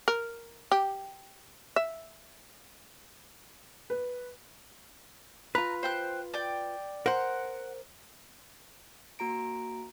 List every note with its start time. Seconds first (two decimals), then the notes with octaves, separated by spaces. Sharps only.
0.08 A#4
0.72 G4
1.76 E5
3.90 B4
5.55 F4 B4 A#5
5.83 C5 G5 F#6
6.34 D5 G5
7.06 A#4 C5 F#5
9.19 A#3 F#4 A#5 D7